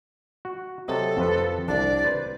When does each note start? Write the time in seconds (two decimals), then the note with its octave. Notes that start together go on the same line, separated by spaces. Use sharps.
0.45 F#4
0.88 C3 F#3 A4 D#5
1.17 F2 F3 B4
1.68 C2 D4 D5
2.04 B4 C5